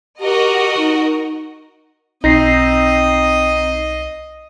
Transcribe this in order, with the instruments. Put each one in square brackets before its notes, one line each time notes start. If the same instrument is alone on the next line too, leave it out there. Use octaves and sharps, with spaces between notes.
[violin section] F#4 A#4 D#5 [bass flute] G4
[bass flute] D#4
[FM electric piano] B1 A#6 C7 [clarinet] C4 [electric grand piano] D#4 [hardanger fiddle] D#5